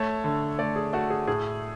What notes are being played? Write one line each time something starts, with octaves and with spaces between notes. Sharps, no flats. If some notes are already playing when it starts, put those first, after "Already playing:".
Already playing: A3 C#5
D3
A3 D5
G#4
A3 F#4
G#4
A2 G#4